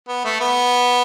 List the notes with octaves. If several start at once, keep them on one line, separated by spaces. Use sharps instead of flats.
B3
A3
B3